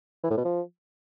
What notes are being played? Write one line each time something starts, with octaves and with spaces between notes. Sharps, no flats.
E3
A2
B2
F3